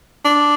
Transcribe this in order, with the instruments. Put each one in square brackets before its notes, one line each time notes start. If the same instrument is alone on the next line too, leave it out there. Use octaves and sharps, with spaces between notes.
[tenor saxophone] D4